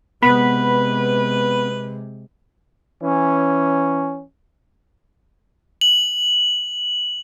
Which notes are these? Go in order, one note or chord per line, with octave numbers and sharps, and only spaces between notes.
C3 G#3 B3 B4 B5
E3 C#4
F#7